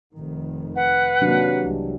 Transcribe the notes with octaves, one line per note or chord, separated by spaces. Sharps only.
F1 D#3
B4 F#5
C3 D#3 F#3 A#3 D4
C2 E3 G#3